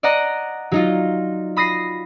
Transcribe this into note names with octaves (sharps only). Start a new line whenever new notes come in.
D5 D#5 F#5 A#5
F#3 D#4 F4
B5 D#6 A#6 C7